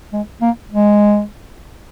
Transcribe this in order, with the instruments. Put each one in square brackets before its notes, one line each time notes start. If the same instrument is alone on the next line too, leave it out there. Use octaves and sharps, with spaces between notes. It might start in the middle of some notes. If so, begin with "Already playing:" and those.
[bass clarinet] G#3
A#3
G#3